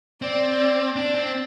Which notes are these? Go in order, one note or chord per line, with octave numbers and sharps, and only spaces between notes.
C4 D5
D4
C4